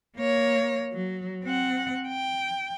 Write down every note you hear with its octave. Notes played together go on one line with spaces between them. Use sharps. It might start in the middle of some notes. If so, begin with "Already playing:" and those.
A#3 C#5
F#3
C4 F#5
G5